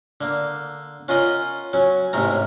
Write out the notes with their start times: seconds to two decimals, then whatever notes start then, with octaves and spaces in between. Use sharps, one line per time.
0.21 D3 A#3
1.08 C#4 F4 A#4 D#5 F#5
1.73 F#3 C#4
2.13 A1 G#2 C3 A3 A#4 A#5